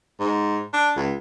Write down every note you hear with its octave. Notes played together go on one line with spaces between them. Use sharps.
G#2
D4
C#2